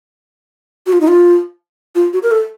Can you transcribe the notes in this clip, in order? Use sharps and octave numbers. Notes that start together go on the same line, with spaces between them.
F#4
F4
D#4
F4
F4
F#4
A#4
A4